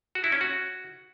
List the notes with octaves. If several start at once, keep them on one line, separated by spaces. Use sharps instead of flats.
F#4
E4
C#4
F#4